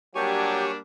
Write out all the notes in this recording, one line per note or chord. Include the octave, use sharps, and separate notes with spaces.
F#3 G3 A#3 D4 G4 C#5 G#5 C#6